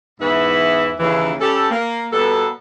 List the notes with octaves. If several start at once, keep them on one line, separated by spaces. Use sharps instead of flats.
E2 G#2 E3 B3 E4 B4
D#2 C#3 E3
G3 C#4 G4 A4
A#3
B2 G3 A#3 B3 A4